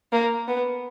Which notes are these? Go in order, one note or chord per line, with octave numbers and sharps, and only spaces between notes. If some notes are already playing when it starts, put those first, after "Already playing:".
A#3
B3